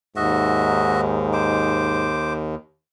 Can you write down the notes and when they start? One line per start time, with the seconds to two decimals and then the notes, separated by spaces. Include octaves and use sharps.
0.16 D#2 G#2 F#4 D#5 E5
1.33 C5 D6